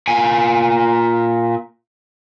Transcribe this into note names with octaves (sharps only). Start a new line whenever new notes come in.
A#2 G#5